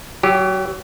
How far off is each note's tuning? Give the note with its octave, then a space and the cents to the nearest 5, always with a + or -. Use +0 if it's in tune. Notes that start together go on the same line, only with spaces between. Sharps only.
F#3 +30 G4 +0